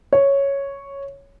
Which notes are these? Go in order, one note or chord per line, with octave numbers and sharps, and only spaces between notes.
C#5